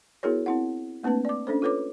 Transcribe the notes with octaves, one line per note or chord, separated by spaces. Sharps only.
B3 E4 F#4 G#4 A#4 C#5
C4 E4 F#5
A3 A#3 C4 D4 B4 A5
D5 D6
C#4 D4 A4 C5
F4 A4 B4 C#5 D6